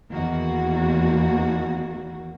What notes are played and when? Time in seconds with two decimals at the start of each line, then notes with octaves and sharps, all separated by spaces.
0.11 E2 D#3 A#3 F#4